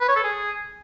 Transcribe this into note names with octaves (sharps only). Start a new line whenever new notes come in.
B4
C#5
A4
G#4